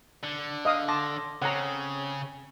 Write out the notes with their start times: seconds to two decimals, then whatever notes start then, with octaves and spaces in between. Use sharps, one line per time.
0.23 D3
0.65 D#5 F5 D#6
0.88 A5 C6 D6 A#6
1.42 C#3 C4 A4 C#5 F#5 A#5